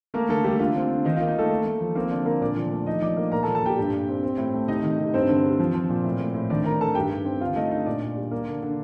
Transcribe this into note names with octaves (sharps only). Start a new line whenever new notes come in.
A3 A#3 A#4
D3 A3 A4
G3 A3 G4
D3 F4
C4
D3
D#3 D#4
A#3 F4
D#4
A3 A#3 A4
A3
A3
F3
A#3 C4 A#4
D3 D4 D5
D3 A#3 A#4
A#2 D4 D5
F3
A3
F3 D#4 D#5
F3 D5 D6
A#3
A#2 A#4 A#5
A4 A5
F3
A4 A5
A#2 G4 G5
G2
G2
C4
C4
A2
A3
C3 D#4 D#5
D#3
C3
G2 C4 C5
D3
G3
F3
F3
A#2
A2
A2
A2
D#3 D4 D5
D#3 A#4 A#5
D#3 A4 A5
G2 G4 G5
G2
C4
D3 F4 F5
A3 D#4 D#5
D3 D#4 D#5
A#2 D4 D5
A#2
G3
A#3
D3
D3